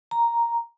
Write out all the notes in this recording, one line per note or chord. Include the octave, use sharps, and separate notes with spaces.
A#5